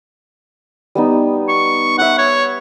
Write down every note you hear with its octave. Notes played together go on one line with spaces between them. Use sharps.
G3 B3 D#4
C#6
E5 F#5 C#6
C#5